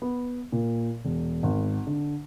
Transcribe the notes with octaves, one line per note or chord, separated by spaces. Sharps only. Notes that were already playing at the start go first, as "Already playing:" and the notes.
B3
A#2
E1
G#1
D3